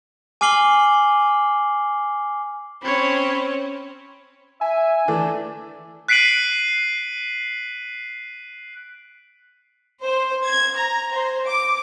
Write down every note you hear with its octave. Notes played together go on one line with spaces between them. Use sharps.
G#5 D6 F6 C7 F#7 G7
C4 C#4 C#5 B5
E5 G#5
E3 A3 D4
F#6 B6 C7 D7 D#7 F#7
C5
G#6
A#5
C5
D6